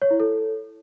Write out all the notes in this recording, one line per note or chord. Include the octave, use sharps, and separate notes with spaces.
C#5
E4
A4